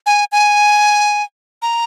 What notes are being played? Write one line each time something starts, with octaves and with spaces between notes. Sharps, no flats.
G#5
G#5
A#5